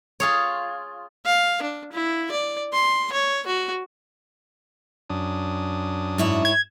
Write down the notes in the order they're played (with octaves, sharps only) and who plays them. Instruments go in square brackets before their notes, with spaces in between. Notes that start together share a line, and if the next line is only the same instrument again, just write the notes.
[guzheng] F4 G#4 C#5
[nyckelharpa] F5
D4
E4
D5
C6
C#5
F#4
[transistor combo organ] F#2 D4 D#6
[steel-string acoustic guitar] G#2 E4 C#5
[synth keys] G#6